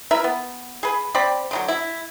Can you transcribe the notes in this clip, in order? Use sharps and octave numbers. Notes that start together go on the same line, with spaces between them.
E4 A#4 B4 E5
B3
G#4 B4
C4 D5 B5
D3 D#3 F#3
E4